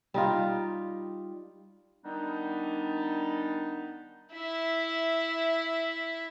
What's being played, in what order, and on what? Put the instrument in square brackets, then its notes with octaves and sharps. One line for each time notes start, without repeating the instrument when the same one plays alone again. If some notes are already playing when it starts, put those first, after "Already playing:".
[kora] G3 D#4 F4
[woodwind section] D#3 G3 B3 D4 D#4
[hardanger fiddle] E4 E5